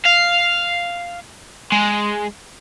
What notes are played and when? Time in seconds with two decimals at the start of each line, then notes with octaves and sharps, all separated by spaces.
0.05 F5
1.72 G#3